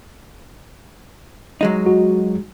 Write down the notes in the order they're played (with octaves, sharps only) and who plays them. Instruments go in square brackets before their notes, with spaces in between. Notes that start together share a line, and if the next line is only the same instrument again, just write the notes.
[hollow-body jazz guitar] F#3 G#3 D#4
[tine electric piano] F#4